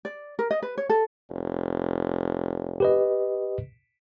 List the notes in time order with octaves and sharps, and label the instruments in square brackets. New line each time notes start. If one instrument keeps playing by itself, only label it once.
[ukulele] D5
A#4
D#5
B4
C#5
A4
[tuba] F1
[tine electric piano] G4 B4 D#5